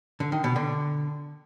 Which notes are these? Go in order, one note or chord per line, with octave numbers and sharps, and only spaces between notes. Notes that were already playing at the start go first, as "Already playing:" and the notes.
D3
D#3
B2
D3